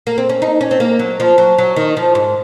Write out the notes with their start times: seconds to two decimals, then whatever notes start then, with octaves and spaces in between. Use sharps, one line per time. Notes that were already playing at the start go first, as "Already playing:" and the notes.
0.07 A#3
0.18 C4
0.29 C#4
0.42 D#4
0.61 C#4
0.71 C4
0.80 A#3
0.99 F#3
1.20 F3
1.38 F#3
1.58 F#3
1.76 D#3
1.97 F3
2.15 G#2